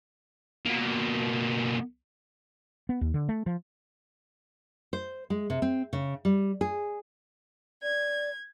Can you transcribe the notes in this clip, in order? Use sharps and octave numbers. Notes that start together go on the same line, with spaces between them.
B2 A#3
B3
D#2
D3
A3
F3
C5
G#3
C3
C4
C#3
G3
G#4
D5 G#6